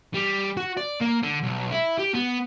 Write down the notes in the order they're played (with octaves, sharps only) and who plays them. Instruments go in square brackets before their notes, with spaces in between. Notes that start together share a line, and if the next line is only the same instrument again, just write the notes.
[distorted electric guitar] G3
F#4
D5
A#3
D3
B1
E4
G4
B3